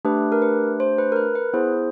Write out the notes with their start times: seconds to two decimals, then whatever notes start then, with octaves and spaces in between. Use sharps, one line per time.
0.05 A3 D4 G4 B4
0.32 A#4
0.42 B4
0.80 C5
0.98 B4
1.12 A#4
1.16 B4
1.35 B4
1.53 B3 E4 G#4 C5